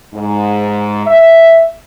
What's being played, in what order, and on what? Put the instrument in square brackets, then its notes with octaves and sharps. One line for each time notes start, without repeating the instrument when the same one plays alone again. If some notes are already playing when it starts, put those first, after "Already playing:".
[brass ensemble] G#2
E5